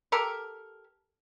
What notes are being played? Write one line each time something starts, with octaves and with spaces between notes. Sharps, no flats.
G4 A4 A#4